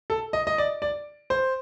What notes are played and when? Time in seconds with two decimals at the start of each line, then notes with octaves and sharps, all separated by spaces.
0.10 A4
0.33 D#5
0.47 D#5
0.58 D5
0.82 D5
1.30 C5